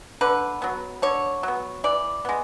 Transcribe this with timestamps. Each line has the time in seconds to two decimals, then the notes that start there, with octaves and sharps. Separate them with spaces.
0.21 D3 B4
0.62 F#3 B3
1.02 D3 C#5
1.43 F#3 B3
1.84 E3 D5
2.25 G#3 B3